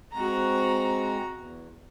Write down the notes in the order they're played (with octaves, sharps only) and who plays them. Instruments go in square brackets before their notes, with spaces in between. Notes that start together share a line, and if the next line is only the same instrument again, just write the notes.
[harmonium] G#3 C4 [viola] F#4 A#5
[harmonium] E2